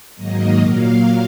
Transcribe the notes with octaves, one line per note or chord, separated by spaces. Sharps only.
G#2 D#3 F#3 A#3 D#5
A#2 F#3 A#3 F5